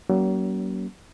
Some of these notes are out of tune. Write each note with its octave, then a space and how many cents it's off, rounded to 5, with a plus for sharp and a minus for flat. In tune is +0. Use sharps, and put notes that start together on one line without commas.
F#3 +40 A#3 +30 C#4 +25